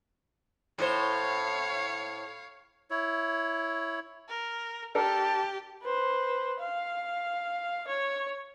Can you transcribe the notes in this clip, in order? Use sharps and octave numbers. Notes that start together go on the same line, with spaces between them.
A2 C5 C#5 F5
E4 C#5
A#4
D4 G4 A4 A#4 A5
B4 C5
F5
C#5